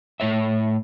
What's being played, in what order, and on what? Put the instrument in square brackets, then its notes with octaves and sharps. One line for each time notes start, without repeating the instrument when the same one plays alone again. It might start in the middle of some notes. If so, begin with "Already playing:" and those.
[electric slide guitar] A2 C#5 E5